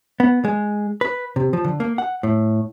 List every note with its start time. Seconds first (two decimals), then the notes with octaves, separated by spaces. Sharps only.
0.20 B3
0.45 G#3
1.01 B4
1.36 C3
1.53 F3
1.64 D3
1.80 A#3
1.98 F#5
2.23 A2